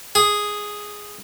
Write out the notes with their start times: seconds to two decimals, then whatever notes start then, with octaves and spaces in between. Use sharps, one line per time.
0.15 G#4